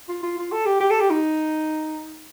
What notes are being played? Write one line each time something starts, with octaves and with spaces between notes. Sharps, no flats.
F4
F4
F4
A4
G4
G4
A4
G4
D#4